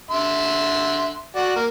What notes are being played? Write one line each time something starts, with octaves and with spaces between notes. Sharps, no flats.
D3 E5 C6
F#4 D5
A#3